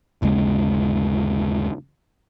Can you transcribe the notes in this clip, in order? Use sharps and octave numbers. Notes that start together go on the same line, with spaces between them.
G1 D#2 C#3 G#3